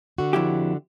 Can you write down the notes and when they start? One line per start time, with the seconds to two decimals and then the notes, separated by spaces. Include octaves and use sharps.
0.18 D3 F#4
0.33 F2 E4 G4